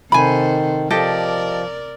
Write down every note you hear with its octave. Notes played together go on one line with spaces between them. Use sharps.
C3 D#3 A4 C5 G#5 B5
F3 G4 A4 A#4 D5 D#5